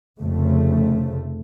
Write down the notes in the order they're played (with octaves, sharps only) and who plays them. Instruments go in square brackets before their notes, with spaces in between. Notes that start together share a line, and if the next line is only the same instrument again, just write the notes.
[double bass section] F1 F2 C#3 A3